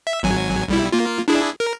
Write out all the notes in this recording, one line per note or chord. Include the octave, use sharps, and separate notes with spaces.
E5
G#1 F#3 G#5
B1 G3 E4
A#3 F4
D4 E4 G#4
A#4